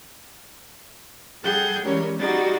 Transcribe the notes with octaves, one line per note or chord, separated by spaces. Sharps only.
G3 G#4 A4 F#5 G5 G6
E3 G3 G#3 C#4 A#4 C#5
G3 D#4 F#4 G#4 D5 A6